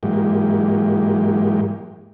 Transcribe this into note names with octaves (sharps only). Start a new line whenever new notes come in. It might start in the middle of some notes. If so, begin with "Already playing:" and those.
G#2 E3 F#3 G#3 A#3 G4